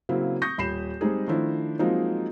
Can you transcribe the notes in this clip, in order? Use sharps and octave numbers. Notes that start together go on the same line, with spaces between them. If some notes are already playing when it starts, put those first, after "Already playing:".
C#3 F#3 A#3 C4 E4
C#6 D#6 G6 A#6
D#1 B5 C7 E7
G3 G#3 C4 D#4 G#4
D#3 F3 A3 D4 E4 C5
F3 F#3 G#3 A#3 C4 D#4